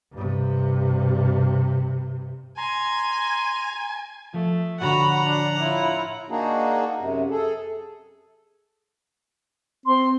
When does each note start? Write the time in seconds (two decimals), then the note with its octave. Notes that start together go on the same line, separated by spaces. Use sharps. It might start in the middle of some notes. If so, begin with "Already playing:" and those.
0.13 G2 C3
2.57 G#5 A#5 C6
4.33 F3 A3 D#6
4.80 A2 D3 F#4 F#5 A#5 B5
5.26 D4 F#6 A6
5.59 E4 F4 C#5 E5
6.30 A#3 D4 D#4 F#4 G#4
6.99 F#2 C3
7.30 G#4 A4
9.86 C4 C6